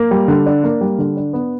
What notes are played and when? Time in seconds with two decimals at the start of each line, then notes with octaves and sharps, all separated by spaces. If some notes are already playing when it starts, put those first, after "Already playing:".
Already playing: A#3
0.11 G3
0.28 D3
0.46 D4
0.64 A#3
0.81 G3
0.98 D3
1.17 D4
1.33 B3